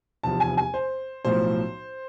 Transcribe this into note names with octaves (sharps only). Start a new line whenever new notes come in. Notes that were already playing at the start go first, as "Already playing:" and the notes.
F1 E2 C3 F3 A5
G#5
G#5
C5
B1 A2 F3 C5